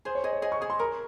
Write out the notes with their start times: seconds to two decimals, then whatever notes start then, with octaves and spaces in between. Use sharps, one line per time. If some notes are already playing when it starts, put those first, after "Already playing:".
0.05 G#4 C5
0.15 C#5
0.24 G#4 D#5
0.33 C#5
0.42 G#4 D#5
0.52 C#6
0.61 G#4 D#6
0.70 C6
0.79 A#4 A#5